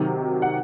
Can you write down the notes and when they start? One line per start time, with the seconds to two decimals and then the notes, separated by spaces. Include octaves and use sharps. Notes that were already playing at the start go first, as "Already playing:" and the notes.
Already playing: C3 D#3 F#3
0.42 F#5